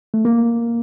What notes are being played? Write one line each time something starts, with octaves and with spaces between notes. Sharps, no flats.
A3
A#3